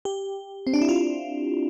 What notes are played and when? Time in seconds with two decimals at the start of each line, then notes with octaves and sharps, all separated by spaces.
0.05 G4
0.67 C4
0.74 D4
0.81 E4
0.89 F4